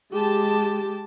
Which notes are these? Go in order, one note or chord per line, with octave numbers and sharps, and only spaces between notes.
G#3 G4 A5